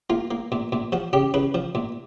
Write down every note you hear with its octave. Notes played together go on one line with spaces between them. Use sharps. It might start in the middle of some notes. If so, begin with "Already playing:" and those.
A#3 F4
A#3
A#2
A#2
F3 F#4
C#3 G4
C#3 B4
F3
A#2